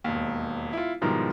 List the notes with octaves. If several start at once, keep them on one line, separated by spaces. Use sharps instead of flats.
E1 D#2
E4 F4
G#2 B2 D#3 F3 G3 E4